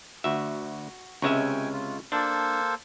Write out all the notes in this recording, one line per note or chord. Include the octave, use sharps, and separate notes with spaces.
D2 F#4 E5
C#2 C3 G#3 C#4 E5 G5 G#5 C#6
F4
A#3 D4 A4 C5 A5